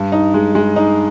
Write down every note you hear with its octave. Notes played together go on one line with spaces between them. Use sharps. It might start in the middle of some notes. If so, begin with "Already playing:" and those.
Already playing: G2
D#4
G#3
G#3
D#4